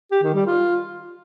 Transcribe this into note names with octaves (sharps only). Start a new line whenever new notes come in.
G4
D#3
G3
F4